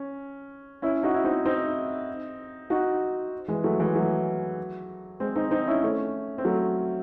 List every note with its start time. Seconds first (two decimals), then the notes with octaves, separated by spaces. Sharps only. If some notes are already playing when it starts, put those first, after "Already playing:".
Already playing: C#4
0.82 C#4 E4
1.03 D#4 F#4
1.14 E4
1.24 C4 D#4
1.45 C4 D#4
2.70 D#4 F#4
3.48 E3 G#3
3.64 F#3 A3
3.79 E3 G#3
3.95 F#3 A3
5.20 G#3 C4
5.36 C4 D#4
5.51 C4 D#4
5.67 C#4 E4
5.83 A3 C#4
6.38 C4
6.45 F#3 A3